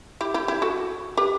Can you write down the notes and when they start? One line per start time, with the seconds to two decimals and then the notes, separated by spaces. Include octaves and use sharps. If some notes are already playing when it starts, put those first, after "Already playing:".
0.21 E4 G4
0.34 E4 G4
0.48 E4 G4
0.62 F#4 A4
1.17 G4 B4